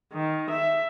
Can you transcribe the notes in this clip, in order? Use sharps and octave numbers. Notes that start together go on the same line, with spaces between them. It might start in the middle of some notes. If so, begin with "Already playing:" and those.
D#3
E5